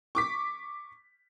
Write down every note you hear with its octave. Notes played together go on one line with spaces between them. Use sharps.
C#6 D6 B6